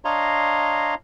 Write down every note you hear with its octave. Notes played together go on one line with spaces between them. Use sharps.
D4 C#5 D#5 F5 A#5 C6